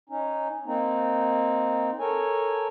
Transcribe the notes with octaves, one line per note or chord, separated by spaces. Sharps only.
C#4 D#4
A#3 C4 D#4
A4 A#4 C#5 G#5